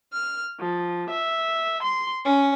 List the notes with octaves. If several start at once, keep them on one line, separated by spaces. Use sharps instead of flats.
F6
F3
E5
C6
C#4